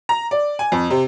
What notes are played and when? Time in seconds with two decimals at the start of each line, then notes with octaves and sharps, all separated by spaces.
0.09 A#5
0.31 D5
0.59 G#5
0.72 F2
0.90 C3